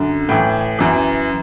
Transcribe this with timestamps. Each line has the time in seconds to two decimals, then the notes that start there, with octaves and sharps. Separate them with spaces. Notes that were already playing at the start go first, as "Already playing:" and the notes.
Already playing: F#2 D3
0.29 A2 E3 G5
0.79 F#2 E3